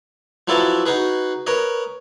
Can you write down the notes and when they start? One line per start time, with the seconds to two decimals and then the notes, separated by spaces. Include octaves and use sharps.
0.48 F3 F#3 E4 A4 B4 C#5
0.86 D#4 F#4 G#4 B4
1.47 A#4 B4 C#5 D#5